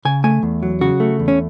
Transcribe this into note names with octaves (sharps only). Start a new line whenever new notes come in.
C#3 G#5
A3 G#5
E2
F#3
C#3 F#4
A3
E2
C#4